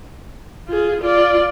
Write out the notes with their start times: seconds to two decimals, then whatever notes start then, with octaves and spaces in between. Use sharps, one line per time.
0.68 F4 G#4
1.02 F4 D5